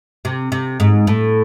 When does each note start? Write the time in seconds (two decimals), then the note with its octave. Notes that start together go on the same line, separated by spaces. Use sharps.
0.25 C3
0.52 C3
0.80 G#2
1.07 A2